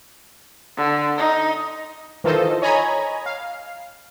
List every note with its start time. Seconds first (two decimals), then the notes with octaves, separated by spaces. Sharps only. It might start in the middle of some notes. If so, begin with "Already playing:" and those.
0.77 D3
1.18 D#4
2.24 D#3 E3 F4 A4 C5 D#5
2.62 C#5 D#5 G#5 A#5 B5 G#6
3.26 F5